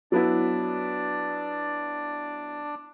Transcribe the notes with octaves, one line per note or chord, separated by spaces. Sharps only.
F#3 B3 D4 E4 D5